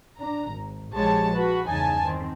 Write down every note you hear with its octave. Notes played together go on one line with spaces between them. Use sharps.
D4 A#5
G#1
A#1 F3 G#3 G4 C#5 A5
F#4 B4
E2 G2 C#3 D#4 G#5 A5
D#3 C4